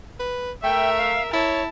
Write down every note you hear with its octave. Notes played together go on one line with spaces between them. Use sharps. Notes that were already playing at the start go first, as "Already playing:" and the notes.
B4
A3 A#4 E5 G5
F5
E4 C#5 A5